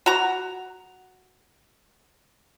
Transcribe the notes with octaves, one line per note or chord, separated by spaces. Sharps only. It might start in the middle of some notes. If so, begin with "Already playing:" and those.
F#4 A#5